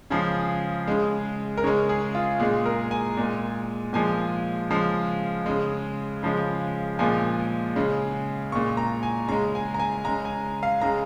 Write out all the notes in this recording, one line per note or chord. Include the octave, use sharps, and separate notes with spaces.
C#3 F3 G#3 G#4
C#3 G#3
A#4
C#3 G#3 C#5
G#4
F4
A#2 G#3 G#4
A#4
G#5
A#2 G#3
A#2 F3 G#3 G#5
C#3 F3 G#3
C#3 G#3
C#3 F3 G#3
A#2 F3 G#3 G#5
C#3 G#3
A#2 G#3 C#6
A#5
G#5
C#3 G#3 A#5
G#5
A#5
G#5
C#3 G#3 A#5
G#5
F5
C#3 G#3 A#5